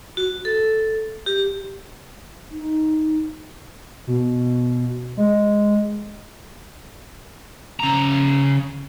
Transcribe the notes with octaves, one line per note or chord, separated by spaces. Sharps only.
F#4
A4
G4
D#4
B2
G#3
C#3 A#5